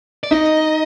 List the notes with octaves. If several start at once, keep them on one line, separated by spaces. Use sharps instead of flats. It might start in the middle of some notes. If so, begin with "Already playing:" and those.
D5
D#4 D#5